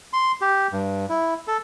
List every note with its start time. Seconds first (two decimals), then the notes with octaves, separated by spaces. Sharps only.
0.13 C6
0.41 G4
0.72 G2
1.09 E4
1.47 A4